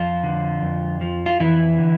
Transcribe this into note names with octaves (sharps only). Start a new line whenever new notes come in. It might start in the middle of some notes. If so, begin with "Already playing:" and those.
Already playing: F2 F3 F4
D3
F2
F3
F4
F2 E3 E4
D3